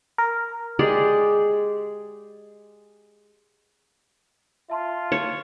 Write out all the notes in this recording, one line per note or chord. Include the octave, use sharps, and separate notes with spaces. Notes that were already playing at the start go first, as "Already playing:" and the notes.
A#4
G#3 G4 G#4 D5
F4 E5 A5 C6
C#5